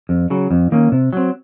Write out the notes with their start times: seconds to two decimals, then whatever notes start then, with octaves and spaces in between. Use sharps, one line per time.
0.09 F2
0.30 C#3 F#3
0.51 F2
0.72 D#3 A#3 C#4
0.92 C3
1.13 F#3 C4